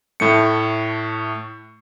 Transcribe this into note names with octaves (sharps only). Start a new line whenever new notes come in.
A2 A3 C#7